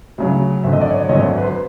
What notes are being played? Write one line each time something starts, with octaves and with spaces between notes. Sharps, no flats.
D2 C#3 F#3
G#1 F#2 D3 E5
D#5
D5
C#5 D#5
G#1 F#2 D3 C#5 D#5
D5 E5
B4
C5